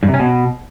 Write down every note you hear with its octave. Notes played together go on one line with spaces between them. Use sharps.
G2
C3
C#4
B2